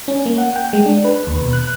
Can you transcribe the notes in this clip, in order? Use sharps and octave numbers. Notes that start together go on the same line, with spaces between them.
C#4
A#3
F#5
G5
G#3
D4
B4
D#2
B2
F#6